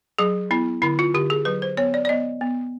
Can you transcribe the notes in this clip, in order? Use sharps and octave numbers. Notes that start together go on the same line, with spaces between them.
F#3 G#4
B3 E4
D3 E4
F4
D3 G4
G#4
F#3 B4
C5
B3 C#5
D5
D5
B3 D#5
B3